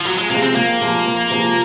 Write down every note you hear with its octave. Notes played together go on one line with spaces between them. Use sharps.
F3
F2 F#3
G#3
C3 F3 G#3 A#3
C4
F2 A#3
C3 F3 G#3
F2
C3 F3 G#3